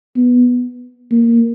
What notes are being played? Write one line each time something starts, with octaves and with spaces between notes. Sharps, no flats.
B3
A#3